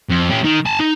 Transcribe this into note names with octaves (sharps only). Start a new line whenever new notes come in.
F2
C#4 G4
D#3
G#5 A5
D#4